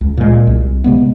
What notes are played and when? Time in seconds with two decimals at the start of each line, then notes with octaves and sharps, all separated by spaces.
0.01 C#2
0.17 A#2 G#3
0.47 C2
0.84 C3 G#3 B3